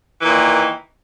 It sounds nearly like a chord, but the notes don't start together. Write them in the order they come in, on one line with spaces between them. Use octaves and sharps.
E3 A#2 D#3